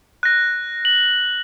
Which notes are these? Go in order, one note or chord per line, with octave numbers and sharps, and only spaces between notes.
F#6 A#6
F#7